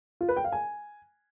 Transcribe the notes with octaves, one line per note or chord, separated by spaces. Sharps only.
F4
B4
G5
F5
G#5